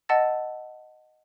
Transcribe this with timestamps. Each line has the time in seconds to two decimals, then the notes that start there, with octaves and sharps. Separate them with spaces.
0.09 D#5 F#5 A5 E6 A6